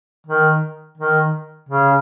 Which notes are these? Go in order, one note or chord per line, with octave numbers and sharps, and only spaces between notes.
D#3
D#3
C#3